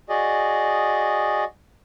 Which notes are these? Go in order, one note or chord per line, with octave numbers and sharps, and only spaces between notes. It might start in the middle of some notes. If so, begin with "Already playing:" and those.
F#4 G#4 D5 D#5